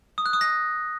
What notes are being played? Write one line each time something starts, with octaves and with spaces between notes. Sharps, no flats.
D#6
F#6
D#6
A#6